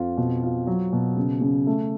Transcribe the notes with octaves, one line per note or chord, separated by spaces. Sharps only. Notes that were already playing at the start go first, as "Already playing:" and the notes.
Already playing: F2 F4
B2
F4
F#3
B2
C#3
C#3
A3